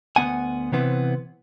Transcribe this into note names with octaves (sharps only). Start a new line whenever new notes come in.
D2 A#3 B3 F#5 G#5
C3 E3 B3 C4